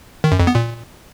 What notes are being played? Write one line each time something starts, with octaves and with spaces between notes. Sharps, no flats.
D#3
F#2
F2
B3
A#2